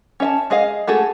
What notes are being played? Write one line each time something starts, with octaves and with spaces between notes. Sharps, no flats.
C#4 E5 A5
G#3 G#4 D#5 F5
G#3 A3 F#4 G#4 A4